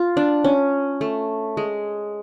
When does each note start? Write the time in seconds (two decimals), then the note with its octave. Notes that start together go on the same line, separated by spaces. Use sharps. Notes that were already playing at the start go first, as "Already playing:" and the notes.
Already playing: F4
0.17 D4
0.44 C#4
1.01 A3
1.57 G#3